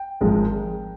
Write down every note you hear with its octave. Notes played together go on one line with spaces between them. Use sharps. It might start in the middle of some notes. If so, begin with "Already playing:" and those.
Already playing: G5
G#1 G#2 F3 G#3